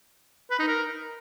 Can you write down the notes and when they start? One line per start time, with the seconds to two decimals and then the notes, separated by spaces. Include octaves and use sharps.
0.51 B4
0.59 D#4
0.68 A#4